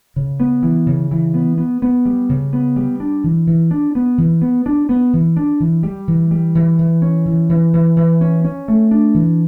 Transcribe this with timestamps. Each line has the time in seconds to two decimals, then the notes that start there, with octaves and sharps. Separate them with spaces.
0.16 C#3
0.40 B3
0.63 E3
0.86 C#3
1.11 E3
1.34 B3
1.58 B3
1.82 B3
2.05 G3
2.29 C#3
2.53 B3
2.76 G3
3.00 D4
3.24 E3
3.47 E3
3.71 D4
3.95 B3
4.18 E3
4.42 B3
4.66 D4
4.89 B3
5.13 E3
5.37 D4
5.60 E3
5.83 G3
6.08 E3
6.31 G3
6.55 E3
6.79 E3
7.02 C#4
7.26 E3
7.49 E3
7.73 E3
7.96 E3
8.21 C#4
8.44 C#4
8.68 A3
8.91 D4
9.14 E3